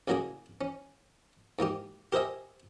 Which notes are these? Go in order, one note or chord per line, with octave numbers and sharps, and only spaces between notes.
A1 C#3 F#3 A#3 G#4 G#5
C#4
G#2 A#3 D#4 G4
G4 A#4 C5 D#5 E5 G#5